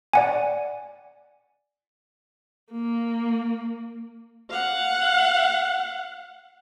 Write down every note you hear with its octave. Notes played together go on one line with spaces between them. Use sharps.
D5 F#5 G#5
A#3
F5 F#5